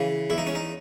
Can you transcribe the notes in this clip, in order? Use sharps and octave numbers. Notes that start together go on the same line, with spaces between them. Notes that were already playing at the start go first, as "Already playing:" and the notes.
Already playing: C#3 E3
E2 E4
D#4
C#4
D#4